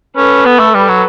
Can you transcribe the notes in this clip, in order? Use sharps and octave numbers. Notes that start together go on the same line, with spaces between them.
C#4 A4 B4
B3
A3
G3 A4 B4
F#3